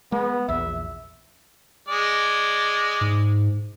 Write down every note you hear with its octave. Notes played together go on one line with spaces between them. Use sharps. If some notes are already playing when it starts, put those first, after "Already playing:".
G#3 B3
A#1 E2 E5
G#3 D5
G#2